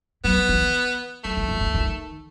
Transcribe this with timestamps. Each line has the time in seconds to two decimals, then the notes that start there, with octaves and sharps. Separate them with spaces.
0.24 F#3 B3
0.49 E3
1.24 F#3 A3
1.37 E3
1.48 D#3
1.61 E3
1.74 D#3